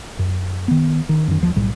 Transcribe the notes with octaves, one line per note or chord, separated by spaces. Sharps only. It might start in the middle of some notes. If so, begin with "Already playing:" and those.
F#2
D#3 B3
D#3
F#2 D#3
D#2 F3
B1 A2 G3